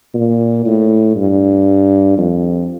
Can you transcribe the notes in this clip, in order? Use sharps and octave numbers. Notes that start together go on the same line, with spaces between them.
A#2
A2
G2
F2